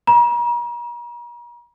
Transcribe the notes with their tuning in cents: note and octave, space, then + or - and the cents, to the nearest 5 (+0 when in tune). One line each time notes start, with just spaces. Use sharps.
A#5 +40